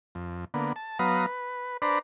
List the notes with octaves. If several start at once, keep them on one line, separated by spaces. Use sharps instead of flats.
F2
D3 A#3 B3
A5
F#3 B3 B4 F5 A#5 D#6
B4
D4 B4 C5 D5 A#5 B5